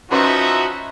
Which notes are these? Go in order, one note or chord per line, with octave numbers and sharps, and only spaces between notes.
F3 C#4 D#4 F#4 B4 E5 C6